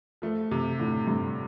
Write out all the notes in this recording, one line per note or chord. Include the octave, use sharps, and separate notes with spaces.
F3 A3
C3 F3
A2 D3
G2 C3